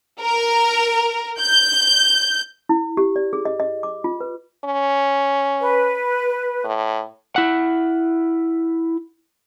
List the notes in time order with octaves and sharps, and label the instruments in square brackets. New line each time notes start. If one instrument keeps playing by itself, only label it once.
[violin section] A#4
G6
[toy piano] E4
G4
D5
G#4
D#5
D#5
D6
F4
B4
[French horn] C#4
[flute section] B4
[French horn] A2
[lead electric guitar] E4 F#5